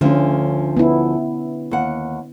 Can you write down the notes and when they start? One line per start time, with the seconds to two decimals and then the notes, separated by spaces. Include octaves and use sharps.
0.01 D2 D3 F3 C#4
0.77 B3 E4
1.71 D#2 F#5